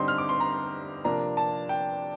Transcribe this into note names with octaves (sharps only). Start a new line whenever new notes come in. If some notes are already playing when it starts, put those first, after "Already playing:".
Already playing: D3 G3 C4 D#4 C6
F6
D6
C6
A#5
C3 F3 A#3 D4 A#5
A5
G5